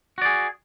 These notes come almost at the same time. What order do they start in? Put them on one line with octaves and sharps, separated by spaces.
F#4 D5 G#4